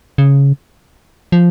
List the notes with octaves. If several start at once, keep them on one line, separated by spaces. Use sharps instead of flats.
C#3
F3